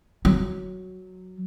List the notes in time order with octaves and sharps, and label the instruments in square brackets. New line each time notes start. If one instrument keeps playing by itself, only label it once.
[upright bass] F#3